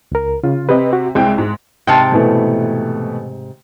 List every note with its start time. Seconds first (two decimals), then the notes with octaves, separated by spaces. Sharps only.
0.12 C#2 A#4
0.43 C#3 F4
0.69 C3 C4 G4 B4 D#5
0.93 F#4
1.15 C2 G#3 C4 G5
1.38 G#2
1.87 G#2 C3 G5 A5 C6
2.12 B2 E3 A3